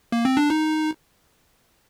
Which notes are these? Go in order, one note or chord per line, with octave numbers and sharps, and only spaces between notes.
A#3
C4
D4
D#4